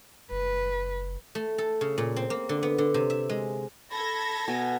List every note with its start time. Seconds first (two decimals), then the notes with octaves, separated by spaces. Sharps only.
0.31 F#1 B4
1.35 A3
1.58 A4
1.81 C#3
1.98 A#2
2.16 C4
2.30 A#3
2.49 D3
2.63 B3
2.78 D3
2.94 C3
3.10 E5
3.29 G#3
3.93 A4 B5 G#6 A#6
4.48 B2 G#5